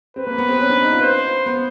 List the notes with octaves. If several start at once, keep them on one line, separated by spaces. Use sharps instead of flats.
C4 B4
A#3
B3
C4
C#4
D4
D#4
F4
C5
B3